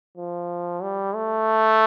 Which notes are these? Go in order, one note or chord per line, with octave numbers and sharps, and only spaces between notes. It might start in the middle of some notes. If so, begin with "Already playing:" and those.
F3
G3
A3